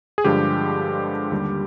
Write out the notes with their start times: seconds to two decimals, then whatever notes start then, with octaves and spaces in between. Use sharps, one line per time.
0.18 G#4
0.25 G2 D3 F3 G#3 G4
1.32 D#2 D3 G3